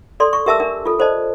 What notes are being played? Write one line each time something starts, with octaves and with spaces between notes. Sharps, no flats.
A4 D5 C6
C#6
G4 A#4 E5 A5 D6 E6
D4 A#4
F4 A4
A4 C5 D5 D#5 A5